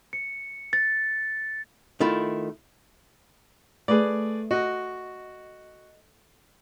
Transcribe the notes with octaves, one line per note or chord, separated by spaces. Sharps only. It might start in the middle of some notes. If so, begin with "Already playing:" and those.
C#7
A6
D#3 A3 E4 F4
A3 G#4 B4 D5
F#4 D#5